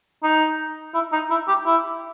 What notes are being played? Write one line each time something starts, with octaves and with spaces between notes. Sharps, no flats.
D#4
E4
D#4
E4
G4
E4